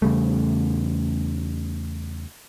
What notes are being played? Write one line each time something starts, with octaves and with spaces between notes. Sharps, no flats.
E2 C#3 G3 A3